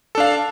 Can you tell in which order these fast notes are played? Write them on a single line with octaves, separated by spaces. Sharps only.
A4 D4 F5